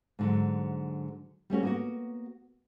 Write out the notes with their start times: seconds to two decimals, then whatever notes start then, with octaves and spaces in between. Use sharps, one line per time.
0.19 G#2 D3 F#3
1.50 G3 A3 C#4 F#4
1.63 A#3 B3 F#4